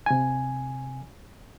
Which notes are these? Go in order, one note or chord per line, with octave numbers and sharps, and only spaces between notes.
C3 G#5